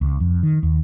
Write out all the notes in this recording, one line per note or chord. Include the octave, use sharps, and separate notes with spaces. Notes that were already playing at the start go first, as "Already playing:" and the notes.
C#2
F2
D#3
D#2